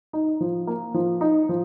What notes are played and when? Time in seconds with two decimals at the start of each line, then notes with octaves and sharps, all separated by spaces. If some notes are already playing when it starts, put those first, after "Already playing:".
0.13 D#4
0.41 F3
0.67 A#3
0.94 F3
1.21 D#4
1.49 F3